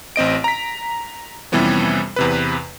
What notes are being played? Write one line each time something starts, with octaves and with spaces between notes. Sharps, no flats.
A1 C4 D#5 D7
A#5 B6
F2 C3 E3 G3 B3 C#4
E2 C3 B4